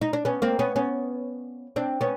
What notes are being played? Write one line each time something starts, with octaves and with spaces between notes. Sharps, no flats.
D#4
D4
B3 C#4
A#3 C4
B3 C#4
B3 C#4
C4 D4
B3 C#4